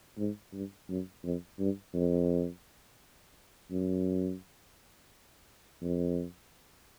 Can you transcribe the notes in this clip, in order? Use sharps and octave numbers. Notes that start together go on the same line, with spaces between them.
G#2
G2
F#2
F2
G2
F2
F#2
F2